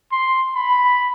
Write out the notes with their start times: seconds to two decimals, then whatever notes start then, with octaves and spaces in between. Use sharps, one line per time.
0.12 C6
0.55 B5